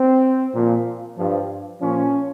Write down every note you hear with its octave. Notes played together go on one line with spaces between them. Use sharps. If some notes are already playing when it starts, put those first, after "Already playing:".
Already playing: C4
A#2 F3
G2 F3
A#2 F3 C#4